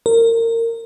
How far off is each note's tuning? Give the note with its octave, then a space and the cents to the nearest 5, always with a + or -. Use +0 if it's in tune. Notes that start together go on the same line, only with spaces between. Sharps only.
A#4 -25